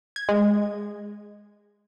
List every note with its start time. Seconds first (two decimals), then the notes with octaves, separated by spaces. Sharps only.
0.16 G#6
0.29 G#3